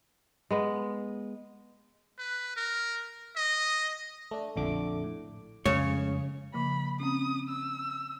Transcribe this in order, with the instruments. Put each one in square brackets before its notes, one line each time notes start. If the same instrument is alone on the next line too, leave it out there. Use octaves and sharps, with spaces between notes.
[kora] G#3 B3
[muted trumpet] B4
A#4
D#5
[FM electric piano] A3 D4
A#1 F2 D3 A3 D6
A2
[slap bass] F2 G#3 A3 [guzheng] C#3 [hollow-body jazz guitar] C#5
[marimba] C#3 F3 A#3 [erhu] B5
[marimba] C4 C#4 [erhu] D#6
[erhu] E6